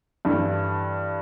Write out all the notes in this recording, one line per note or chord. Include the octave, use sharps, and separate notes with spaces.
G2 E3 A3